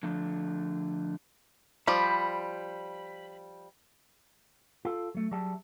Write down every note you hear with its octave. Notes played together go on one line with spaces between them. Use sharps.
D3 F3 A3 D4
F3 G3 B5
F4 A4
F#3 A3
F#3 G3 G#4 E5 A5